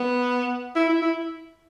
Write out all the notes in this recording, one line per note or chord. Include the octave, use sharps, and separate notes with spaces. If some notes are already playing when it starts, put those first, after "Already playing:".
Already playing: B3
E4
E4
E4